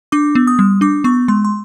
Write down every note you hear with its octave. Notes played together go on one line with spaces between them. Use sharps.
D4 D6
B3
D#6
G3
D4 D6
B3 C#6
G#3 C6
C6